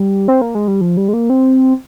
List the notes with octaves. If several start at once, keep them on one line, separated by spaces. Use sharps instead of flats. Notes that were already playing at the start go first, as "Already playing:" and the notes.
Already playing: G3
C4
A#3
G#3
G3
F3
G3
G#3
A#3
C4